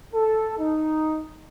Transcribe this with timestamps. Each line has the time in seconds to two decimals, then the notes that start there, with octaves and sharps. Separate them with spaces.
0.13 A4
0.59 D#4